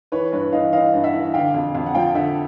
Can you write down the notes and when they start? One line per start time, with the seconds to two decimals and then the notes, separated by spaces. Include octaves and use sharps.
0.12 E3 B4 C#5
0.32 G2 B4 C#5
0.52 E3 D#5 F5
0.73 E3 D#5 F5
0.94 G2
1.04 E5 F#5
1.14 E3
1.34 D3 F5 G5
1.54 F2
1.75 F2
1.86 F#5
1.94 F3 F5 G5
2.15 D3 E5 F#5